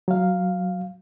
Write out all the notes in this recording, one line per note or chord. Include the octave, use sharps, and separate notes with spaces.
F#3 F5